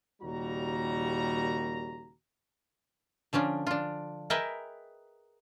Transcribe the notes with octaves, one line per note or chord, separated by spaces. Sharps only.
D#2 A#2 C#3 G3 F#4 A#5
D3 F3 C#4 D4
D4 F4
G#4 A#4 B4 D#5 E5 G5